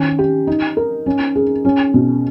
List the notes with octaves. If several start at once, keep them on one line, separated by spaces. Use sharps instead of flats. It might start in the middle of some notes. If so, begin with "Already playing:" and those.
Already playing: D#3 C#4
G4
D#4
A#4
C#4
G#4
C#4
B2